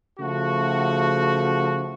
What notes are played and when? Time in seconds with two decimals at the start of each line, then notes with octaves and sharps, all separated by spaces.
0.19 C#3 F3 A3 F#4